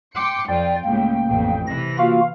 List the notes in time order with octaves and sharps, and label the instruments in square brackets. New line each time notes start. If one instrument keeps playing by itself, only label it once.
[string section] G5 C6 C#7 [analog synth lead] D6
[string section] F2 F4 [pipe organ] D5 [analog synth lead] G5
[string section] C#2 A2 [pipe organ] A#3
[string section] A1 F2
[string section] C3 E3 [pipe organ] A#6
[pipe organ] A#3 F4 F#4 [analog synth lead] F5